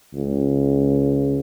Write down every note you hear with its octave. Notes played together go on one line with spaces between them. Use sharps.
C#2